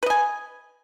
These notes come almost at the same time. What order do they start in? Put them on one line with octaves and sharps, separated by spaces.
B4 D#5 G#5